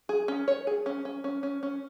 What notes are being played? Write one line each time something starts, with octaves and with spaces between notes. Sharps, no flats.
G#4
C#4
C#5
G#4
C#4
C#4
C#4
C#4
C#4